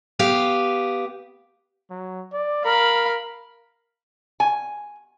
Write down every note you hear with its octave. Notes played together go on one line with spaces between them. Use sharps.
B3 G4 F5
F#3
D5
A#4 F5 B5
G#5